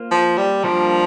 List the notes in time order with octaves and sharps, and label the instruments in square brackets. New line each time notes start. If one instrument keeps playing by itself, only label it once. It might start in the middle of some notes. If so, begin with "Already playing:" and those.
Already playing: [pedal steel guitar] A#3 F4 C5
[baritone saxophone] F3
G3
[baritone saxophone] F3 [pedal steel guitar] G3 A#3 D4 G4 A#4